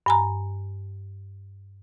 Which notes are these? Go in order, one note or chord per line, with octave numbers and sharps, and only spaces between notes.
G2 G#5 A#5